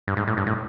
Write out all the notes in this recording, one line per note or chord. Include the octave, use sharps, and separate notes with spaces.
G2
G#2
A2
G2
A2